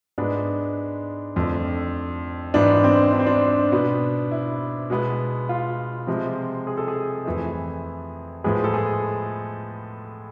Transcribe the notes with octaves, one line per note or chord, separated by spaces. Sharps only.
G#2 G#3 B3 D4
F2 D3 A3
G#2 E3 B3 D4
C4
D4
C4
D4
B2 B3
E4
B2 G#3 B3
F4
C3 F3 G#3
G#4
A4
G#4
F2 E3 A3
A2 F3 G#3 B3 G#4
A4
G#4